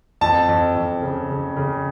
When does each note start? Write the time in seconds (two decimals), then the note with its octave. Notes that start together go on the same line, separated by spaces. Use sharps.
0.21 F2 A5
0.48 F2
0.75 F2
1.02 C#3
1.30 C#3
1.57 C#3